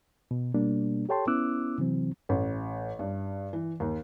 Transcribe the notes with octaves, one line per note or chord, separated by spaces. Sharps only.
B2
B2 G3 A#3 D4
G4 A4 C#5 G5 A5 C6
B3 C#4 E4 D6 E6 F#6
C3 E3 F#3 C4
A1
G2
E3
D#2